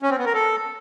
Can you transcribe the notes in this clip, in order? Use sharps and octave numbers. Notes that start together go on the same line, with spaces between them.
C#4
C4
B3
A#4
A4